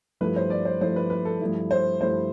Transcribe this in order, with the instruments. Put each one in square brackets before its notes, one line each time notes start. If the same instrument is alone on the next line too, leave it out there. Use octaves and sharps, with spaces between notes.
[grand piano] G2 F3 A3 E4 [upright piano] B4
[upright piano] C5
D5
C5
[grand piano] G2 F3 A3 E4 [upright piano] C5
[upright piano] B4
B4
A4
[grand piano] G2 F3 A3 E4
[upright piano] C5
[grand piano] G2 F3 A3 E4 [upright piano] C5